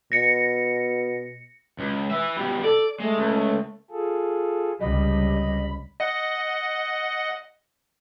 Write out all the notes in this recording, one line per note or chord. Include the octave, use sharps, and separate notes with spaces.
B2 A#6 C#7
C#2
B4 E5
B2 G3
A4 D5
G#3 A3
C#2
F4 G#4 A4
C#2 C3 G3 D#5 B5
D#5 F#5